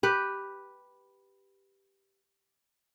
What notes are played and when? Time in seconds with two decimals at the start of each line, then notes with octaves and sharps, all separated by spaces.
0.03 G4 B4